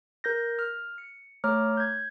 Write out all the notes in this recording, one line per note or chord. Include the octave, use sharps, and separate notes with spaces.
A#4 G6 A#6
F6
C#7
A3 C#5 A#5 D6 F6
G6 G#6